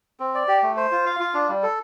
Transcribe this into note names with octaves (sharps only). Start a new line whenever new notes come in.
C4
D5
G4
A3
C5
F4
F5
F4
D4
G3
A4